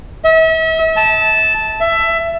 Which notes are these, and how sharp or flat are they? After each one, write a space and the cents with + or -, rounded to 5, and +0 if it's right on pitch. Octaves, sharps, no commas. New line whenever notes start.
E5 -40
A5 -10
E5 +15